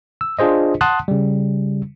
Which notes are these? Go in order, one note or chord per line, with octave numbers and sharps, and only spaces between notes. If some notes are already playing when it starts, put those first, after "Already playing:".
E6
D4 F4 G#4 C5 D#5
F#5 A5 C6 D#6 F#6
C#3 G3